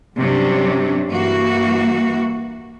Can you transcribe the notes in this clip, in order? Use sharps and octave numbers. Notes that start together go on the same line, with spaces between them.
G2 C3 F#3 C#4 D4
G2 E3 A#3 F#4